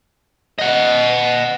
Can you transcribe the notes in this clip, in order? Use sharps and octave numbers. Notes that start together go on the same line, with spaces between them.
D#5 F#5